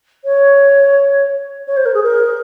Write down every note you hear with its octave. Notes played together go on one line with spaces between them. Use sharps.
C#5
C#5
C5
A#4
G#4
A#4